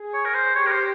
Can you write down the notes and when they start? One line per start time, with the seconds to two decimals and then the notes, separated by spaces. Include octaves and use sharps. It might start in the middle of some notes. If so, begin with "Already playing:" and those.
Already playing: G#4
0.14 C#5
0.25 A#4
0.35 C5
0.55 G4 C#5
0.66 A#4
0.72 C5